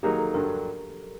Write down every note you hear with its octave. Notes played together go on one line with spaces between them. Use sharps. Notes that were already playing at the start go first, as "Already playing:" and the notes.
D#3 F#3 A#3 D#4 G4 G#4
A4
G2 D3 F#3 A#4